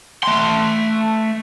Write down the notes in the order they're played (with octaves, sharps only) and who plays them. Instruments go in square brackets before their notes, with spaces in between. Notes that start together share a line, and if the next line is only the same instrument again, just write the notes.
[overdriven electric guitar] A3 C6